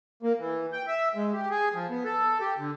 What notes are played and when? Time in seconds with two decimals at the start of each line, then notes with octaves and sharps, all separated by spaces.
0.23 A#3
0.39 E3
0.72 G5
0.87 E5
1.15 G#3
1.33 G4
1.50 G#4
1.74 F3
1.90 B3
2.04 A4
2.41 G4
2.58 D3